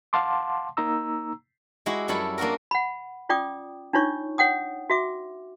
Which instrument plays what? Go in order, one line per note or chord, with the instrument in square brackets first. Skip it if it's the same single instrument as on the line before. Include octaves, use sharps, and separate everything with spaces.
[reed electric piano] F5 F#5 A5 C6 D6
A#3 D#4 A#5 E6
[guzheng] G#3 E4 F#4 G4
F#2 G3 E4 A4 C#5 B5
A#3 D4 F4 F#4 A#4
[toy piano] F#5 B5
C#4 F4 D5 G5 D6 D#6
D4 D#4 F4 C#5 C#6
C#5 F#5 G5 D#6
F#4 E5 D6